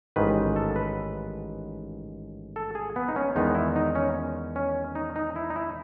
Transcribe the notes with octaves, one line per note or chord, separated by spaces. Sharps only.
A1 G#2 D#3 B4
A4
B4
A4
G#4
B3
D#4
C#4
E2 D#3 G#3 B3 D#4
E4
D#4
C#4
C#4
D#4
D#4
E4
D#4
E4